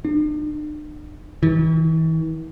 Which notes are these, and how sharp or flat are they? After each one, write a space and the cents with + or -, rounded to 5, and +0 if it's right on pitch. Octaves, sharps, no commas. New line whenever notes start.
D4 +45
E3 -40